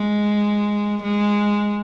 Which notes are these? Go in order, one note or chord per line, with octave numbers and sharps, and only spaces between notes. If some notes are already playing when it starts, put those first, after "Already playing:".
Already playing: G#3
G#3